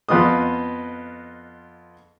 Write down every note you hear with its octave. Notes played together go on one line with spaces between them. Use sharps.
F2 B3 F4 D#5 D#6